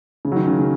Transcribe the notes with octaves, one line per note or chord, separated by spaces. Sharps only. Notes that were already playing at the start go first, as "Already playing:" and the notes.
C#3
F#3
D#3
C#3
C#3